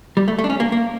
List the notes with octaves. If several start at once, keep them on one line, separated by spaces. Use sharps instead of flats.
G3
A3
A3
D4
C#4
A#3
A#3